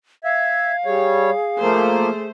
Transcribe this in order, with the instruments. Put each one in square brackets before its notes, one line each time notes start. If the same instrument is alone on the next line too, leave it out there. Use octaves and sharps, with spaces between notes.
[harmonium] E5 [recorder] F5 [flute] G#6
[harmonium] G3 C#5 [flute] G#4
[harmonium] F3 A#3 [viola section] A3 C5